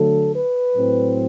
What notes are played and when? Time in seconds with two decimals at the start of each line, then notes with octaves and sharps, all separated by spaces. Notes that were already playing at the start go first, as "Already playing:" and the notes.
Already playing: D3 F#3 A3 A4
0.33 B4
0.75 A2 F#3 C4